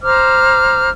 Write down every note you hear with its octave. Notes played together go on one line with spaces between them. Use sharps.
C5 A#5 D6 F6